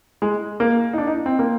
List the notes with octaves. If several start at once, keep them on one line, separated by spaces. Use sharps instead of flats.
G#3
A#3
D#4
D4
D#4
C4
A#3